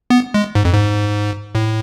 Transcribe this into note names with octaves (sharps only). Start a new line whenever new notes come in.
B3
G#3
G#2
F2
G#2
A2